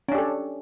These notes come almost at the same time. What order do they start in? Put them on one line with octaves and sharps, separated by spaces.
C#4 D4 G4 A4